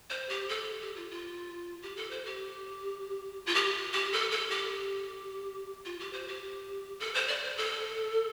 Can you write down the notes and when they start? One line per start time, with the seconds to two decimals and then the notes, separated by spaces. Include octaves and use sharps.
0.10 C5
0.29 G4
0.49 A4
0.82 G4
0.96 F4
1.10 F4
1.82 G4
1.97 A4
2.11 C5
2.26 G4
3.46 F4
3.55 G4
3.93 G4
4.13 A4
4.31 A4
4.51 G4
5.85 F4
6.00 G4
6.13 C5
6.28 G4
7.00 A4
7.14 C5
7.28 D5
7.43 C5
7.57 A4